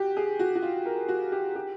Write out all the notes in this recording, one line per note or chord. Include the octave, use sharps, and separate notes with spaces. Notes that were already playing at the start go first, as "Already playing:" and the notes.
Already playing: F#4 G4
G#4
F#4
F#4
F4
A#4
F#4
G4
G4